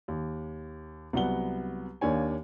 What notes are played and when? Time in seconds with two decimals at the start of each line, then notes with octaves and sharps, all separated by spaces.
0.08 D#2
1.13 C2 F#3 B3 F#5 G7
2.01 D#2 A#3 D4 C#5 G#5